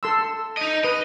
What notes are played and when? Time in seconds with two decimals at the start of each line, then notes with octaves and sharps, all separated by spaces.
0.03 A4 C6 E6
0.57 D#4 D#5
0.84 B4 D#5